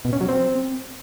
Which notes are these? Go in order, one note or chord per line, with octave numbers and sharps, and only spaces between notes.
B2
C#4
F#3
C4